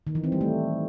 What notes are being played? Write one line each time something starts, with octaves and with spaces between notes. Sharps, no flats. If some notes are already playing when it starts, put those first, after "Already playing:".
D#3
E3
C4
G3
A3